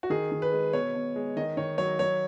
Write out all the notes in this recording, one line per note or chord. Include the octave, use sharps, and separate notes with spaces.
F#4
D#3 G#4
D#3
B4
G#3
B2 C#5
B2
G#3
D#3 D#5
D#3 C#5
F#3 C#5
F#3 C#5